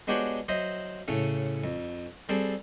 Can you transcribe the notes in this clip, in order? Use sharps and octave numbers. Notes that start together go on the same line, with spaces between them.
G#3 B3 D4 F#4 G4 C#5
F#3 C5 D#5 E5
A2 C#3 A3 C#4
F2
G3 C4 G#4 A4